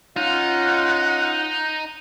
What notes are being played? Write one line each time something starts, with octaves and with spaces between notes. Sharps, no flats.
C#4 D#4 F4 F#5